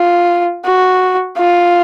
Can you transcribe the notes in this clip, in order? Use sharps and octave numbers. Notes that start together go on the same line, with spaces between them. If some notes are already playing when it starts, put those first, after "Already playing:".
Already playing: F4
F#4
F4